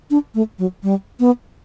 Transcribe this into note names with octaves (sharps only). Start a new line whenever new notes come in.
D4
A3
F#3
G3
B3